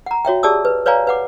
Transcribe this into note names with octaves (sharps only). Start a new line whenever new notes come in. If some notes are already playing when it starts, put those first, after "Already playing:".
F#5 A#5
F#4 C#5 E5 G5
G4 G#4 D5 A5 D#6 E6
B4
B4 C#5 D5 F5 G#5 A#5
B4 F#5 D6